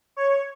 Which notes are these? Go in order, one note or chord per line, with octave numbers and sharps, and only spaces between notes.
C#5